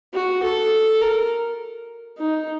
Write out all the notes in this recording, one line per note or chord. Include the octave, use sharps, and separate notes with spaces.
F#4
A4
A#4
D#4